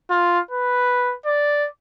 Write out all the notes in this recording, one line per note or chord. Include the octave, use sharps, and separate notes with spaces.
F4
B4
D5